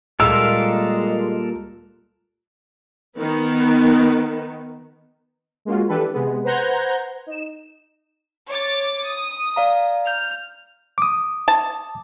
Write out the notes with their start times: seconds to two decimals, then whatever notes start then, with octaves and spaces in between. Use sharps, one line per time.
0.20 A#2 G3 G#3 A4 A#4 F5 E6
3.19 D#3 B3
5.65 G#3 A#3 C#4 F4 F#4
5.88 E3 D4 G4 A4 B4
6.12 C3 G#3 B3
6.44 B4 C5 F#5 A#5 G6 G#6
7.27 D#4 E7
8.48 C#5 D6 A6
9.07 D#6
9.56 D5 F5 A#5
10.07 F6 G6
10.98 D6 D#6
11.48 A5